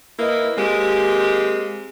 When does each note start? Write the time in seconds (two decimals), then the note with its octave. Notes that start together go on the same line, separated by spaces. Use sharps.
0.19 A#3 E4 B4 D#5
0.57 G#3 A#3 C4 G4